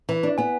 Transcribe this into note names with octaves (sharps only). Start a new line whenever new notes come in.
E3
D4
B3 G#5